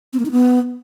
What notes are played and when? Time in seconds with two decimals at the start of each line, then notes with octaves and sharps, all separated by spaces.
0.13 C4
0.19 A#3
0.25 D#4
0.31 B3